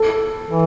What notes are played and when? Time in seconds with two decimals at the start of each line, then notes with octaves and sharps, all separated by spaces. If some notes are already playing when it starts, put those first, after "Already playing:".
Already playing: A4
0.50 E3